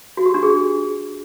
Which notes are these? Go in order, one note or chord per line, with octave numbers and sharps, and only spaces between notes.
F#4
G4
D4
G#4